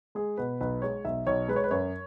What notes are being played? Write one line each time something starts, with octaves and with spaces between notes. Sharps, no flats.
G#3 G#4
B2 B4
B1 B4
G#3 C#5
B1 E5
B1 C#5
G#3 B4
C#5
B4
F#2 C#5